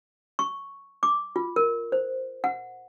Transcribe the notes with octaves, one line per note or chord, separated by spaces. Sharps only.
C#6
D6
F4
A#4
C5
F#5